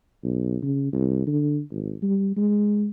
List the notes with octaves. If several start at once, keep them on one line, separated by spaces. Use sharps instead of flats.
B1
C#3
C2
D3
G#1
G3
G#3